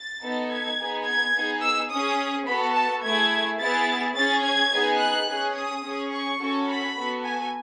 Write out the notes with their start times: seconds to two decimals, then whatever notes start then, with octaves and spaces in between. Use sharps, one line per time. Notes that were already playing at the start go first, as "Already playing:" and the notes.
Already playing: A6
0.22 B3 D#4 A4
0.51 G#6
0.78 B3 D#4 G#4
1.06 G#6
1.35 B3 D#4 G#4
1.62 E6
1.91 C#4 G#4 D#6
2.46 B3 F#4 A4 B5
2.74 A5
3.03 A3 E4 G#4 G#6
3.59 B3 E4 G#4 A6
4.15 C#4 G#4 A6
4.43 G#6
4.72 B3 D#4 G#4
4.99 F#6
5.28 C#4 G#4
5.55 D#6
5.83 C#4 G#4
6.11 C#6
6.39 C#4 F#4 A4
6.68 B5
6.96 B3 F#4 A4
7.25 G#5